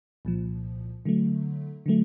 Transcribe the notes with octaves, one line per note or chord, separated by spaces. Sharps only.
C2 A#2 F3
D3 F#3 A3
D3 F#3 A3